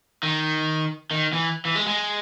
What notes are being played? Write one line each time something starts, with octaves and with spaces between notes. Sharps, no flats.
D#3
D#3
E3
E3
G#3
G#3